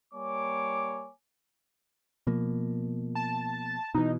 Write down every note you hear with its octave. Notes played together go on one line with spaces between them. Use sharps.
G3 A#3 C#5 G#5 D6
B2 F3 A#3
A5
B2 E3 D#4